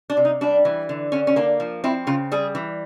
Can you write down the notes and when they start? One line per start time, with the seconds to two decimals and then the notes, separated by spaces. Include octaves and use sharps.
0.10 D4
0.17 C3
0.25 D#4
0.41 G3 D4
0.65 E3
0.89 D3
1.12 D3 C#4
1.27 C#4
1.36 A#3 D4
1.60 F3
1.84 C4 E4
2.07 C#3 F4
2.32 G3 G#4
2.55 E3